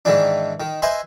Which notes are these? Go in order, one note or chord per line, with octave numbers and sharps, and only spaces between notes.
G#2 D#3 E3 D4
D#3
B4 C5 D#5 E5 G#5